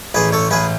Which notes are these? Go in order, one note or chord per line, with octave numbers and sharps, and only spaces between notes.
A1 G#4 B4
A4 C#5
A1 G#4 B4